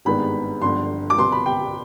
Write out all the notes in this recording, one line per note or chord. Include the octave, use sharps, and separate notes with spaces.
G#1 G2 D#3 G#3 B3 B5
G1 G2 D3 F3 C6
D6
C2 B2 B3 C6
B5
G5